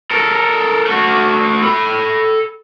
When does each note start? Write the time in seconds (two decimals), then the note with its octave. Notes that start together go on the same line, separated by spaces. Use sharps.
0.11 A4 A#4
0.86 A3 F#4
1.63 A4 B5